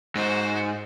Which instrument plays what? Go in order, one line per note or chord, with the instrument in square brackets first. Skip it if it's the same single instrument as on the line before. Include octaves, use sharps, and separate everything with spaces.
[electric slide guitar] G#2 [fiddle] F#4 C5